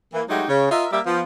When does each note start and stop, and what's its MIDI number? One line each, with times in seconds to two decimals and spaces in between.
0.14 0.23 52
0.14 0.23 58
0.29 0.44 54
0.29 0.44 56
0.29 0.44 57
0.29 0.44 63
0.29 0.44 66
0.29 0.44 67
0.49 0.69 49
0.72 0.88 65
0.72 0.88 70
0.72 0.88 75
0.72 0.88 76
0.93 1.01 55
0.93 1.01 58
0.93 1.01 74
0.93 1.01 76
1.06 1.23 53
1.06 1.23 59